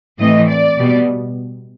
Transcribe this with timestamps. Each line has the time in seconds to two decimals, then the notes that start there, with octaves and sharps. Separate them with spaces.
0.18 A2 E3 A3 C4 D#5
0.49 D5
0.78 B2 G3 B3